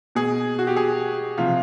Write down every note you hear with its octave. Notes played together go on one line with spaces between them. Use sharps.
B2 G#4
F#4
G4
G#4
C3 F3 F4